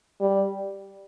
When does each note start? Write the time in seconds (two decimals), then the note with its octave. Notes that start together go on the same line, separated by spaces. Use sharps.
0.21 G3